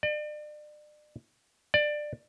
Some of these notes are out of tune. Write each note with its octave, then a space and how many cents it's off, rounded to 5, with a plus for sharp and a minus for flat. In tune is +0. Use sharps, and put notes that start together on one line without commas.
D5 +40
D5 +20